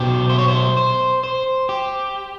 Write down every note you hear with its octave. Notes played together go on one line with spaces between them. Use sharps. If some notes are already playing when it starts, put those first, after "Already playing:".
Already playing: B1 B2 F#3 G4
C5
C#5
C5
C5
C5
G4